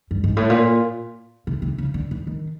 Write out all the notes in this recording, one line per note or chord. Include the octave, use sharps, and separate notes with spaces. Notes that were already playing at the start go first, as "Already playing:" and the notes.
G2
G#2
A2
A#2
C3
C3
C#3
D3
E3
D#3